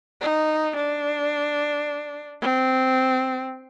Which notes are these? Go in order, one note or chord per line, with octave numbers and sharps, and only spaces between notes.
D#4
D4
C4